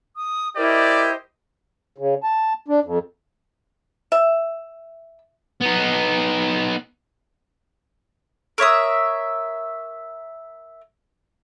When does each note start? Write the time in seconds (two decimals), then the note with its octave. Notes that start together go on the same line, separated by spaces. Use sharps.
0.14 D#6
0.56 E4 G4 A#4 C5 D5 D#5
1.98 C#3
2.23 A5
2.68 D4
2.84 F2
4.12 E5
5.62 B3 D#4
8.58 A#4 C#5 E5 D#6